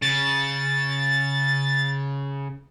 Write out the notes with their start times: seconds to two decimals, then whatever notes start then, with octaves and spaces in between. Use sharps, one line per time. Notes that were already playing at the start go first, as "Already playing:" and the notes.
0.02 C#3 A6